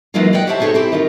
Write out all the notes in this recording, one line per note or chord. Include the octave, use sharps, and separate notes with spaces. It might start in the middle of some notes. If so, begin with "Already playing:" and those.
E3 F#3 G#3 A#3 D#4 F4
D5 D#5 F#5 G5
G4 C5 C#5 E5 F#5 A5
C4 D#4 G#4 A4 C#5
C4 E4 G4
D#3 D#4 F4